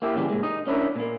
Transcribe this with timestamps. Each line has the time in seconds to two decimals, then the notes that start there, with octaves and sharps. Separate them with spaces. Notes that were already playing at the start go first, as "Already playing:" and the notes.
0.02 A#3 E4 G4
0.15 A#2 C#3 E3 G3
0.30 A#2 G#3
0.43 D#4 D#5
0.67 C#4 D4 E4 A#4
0.96 A#2 A#3